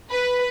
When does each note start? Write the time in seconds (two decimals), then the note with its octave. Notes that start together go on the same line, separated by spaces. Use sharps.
0.10 B4